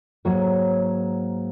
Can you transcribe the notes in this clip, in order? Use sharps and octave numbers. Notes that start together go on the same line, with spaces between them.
G#2 F#3 A#3 C#5